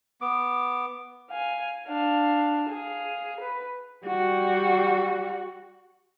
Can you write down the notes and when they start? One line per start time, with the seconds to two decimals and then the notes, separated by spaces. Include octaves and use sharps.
0.21 B3 D6
1.30 F5 G#5
1.87 D4 F5
2.70 G#4 F5
3.41 B4
4.07 G3 F#4